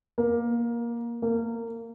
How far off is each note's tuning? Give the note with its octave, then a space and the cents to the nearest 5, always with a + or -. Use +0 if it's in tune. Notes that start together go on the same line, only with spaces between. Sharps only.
A#3 +15
A#3 -25